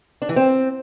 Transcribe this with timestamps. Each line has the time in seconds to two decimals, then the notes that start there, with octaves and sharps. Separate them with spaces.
0.22 D4
0.29 E3
0.36 C4